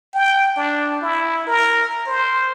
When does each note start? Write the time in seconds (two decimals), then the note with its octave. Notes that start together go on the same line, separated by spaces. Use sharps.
0.14 G5
0.57 D4
1.01 E4
1.47 A#4
2.06 C5